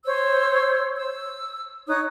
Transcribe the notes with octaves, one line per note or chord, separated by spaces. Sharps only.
C5 C#5 E6
E6
D#4 C#5 D#6 F#6